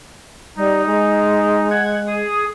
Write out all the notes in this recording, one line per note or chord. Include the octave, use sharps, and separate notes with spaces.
G3 D#4
G#3
F#5 G#6
G#4 D#6